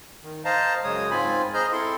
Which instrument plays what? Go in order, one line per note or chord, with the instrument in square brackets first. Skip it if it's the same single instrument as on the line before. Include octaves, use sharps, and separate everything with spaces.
[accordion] D#3
C5 D#5 F5 A5 A#5
F#2 C#3 G#3 C#5 D#6
G#2 C4 F4 G#5 B5
G#4 C5 D#5 A#5 F6 G6
C4 E4 A4 C6